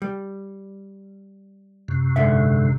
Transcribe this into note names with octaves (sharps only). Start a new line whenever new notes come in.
G3
F#2 C3
G#2 D3 E5